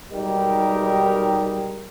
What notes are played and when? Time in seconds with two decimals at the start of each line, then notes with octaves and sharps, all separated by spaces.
0.13 B1 G3 G#3 D#4 G4 A#4